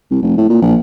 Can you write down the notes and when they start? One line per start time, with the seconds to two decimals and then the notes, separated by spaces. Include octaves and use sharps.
0.11 C2
0.22 F1
0.37 A2
0.49 A#2
0.62 A#1